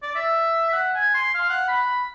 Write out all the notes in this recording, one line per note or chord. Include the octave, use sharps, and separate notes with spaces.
D5
E5
F#5
G#5
C6
F5
F#5
B5